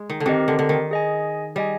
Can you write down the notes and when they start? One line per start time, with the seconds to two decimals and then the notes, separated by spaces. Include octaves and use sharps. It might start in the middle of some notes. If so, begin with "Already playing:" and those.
Already playing: G#3
0.10 D#3
0.20 D3
0.26 D#3 C4 G4 A#4 D#5
0.48 D3
0.59 D3
0.69 D#3
0.91 G#4 D#5 G#5
1.55 G3 G#4 D#5 G#5